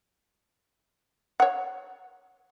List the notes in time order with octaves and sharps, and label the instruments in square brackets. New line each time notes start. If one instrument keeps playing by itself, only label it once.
[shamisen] C#5 F#5